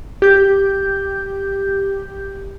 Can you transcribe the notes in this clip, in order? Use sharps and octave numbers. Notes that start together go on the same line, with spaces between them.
G4 G6